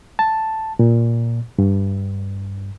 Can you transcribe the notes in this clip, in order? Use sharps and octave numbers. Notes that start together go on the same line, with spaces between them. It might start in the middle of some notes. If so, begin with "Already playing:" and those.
A5
A#2
G2